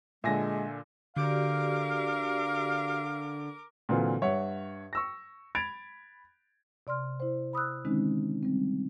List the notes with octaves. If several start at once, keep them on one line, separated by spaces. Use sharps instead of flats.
A#2 D3 G#3 E5 G#5 A#6
D3 F#4 G4 A#4 D5 F5 D6
A#2 D3 E3 F#3 C4 F4
G2 C#5 E5 F#5
C#6 E6 A#6
B5 G#6 A6 D7 F7
C3 D5 C6 F6
E4 C5
B5 D#6 E6 F#6
D3 D#3 G#3 C4 C#4 D#4
G3 C4